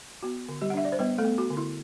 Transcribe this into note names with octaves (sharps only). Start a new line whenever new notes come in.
B3 F#4
D3
G3 G4
F#5
D4 E5
D5
C5
G3 B3 B4
A3 A4
B3
F#4
D3
E4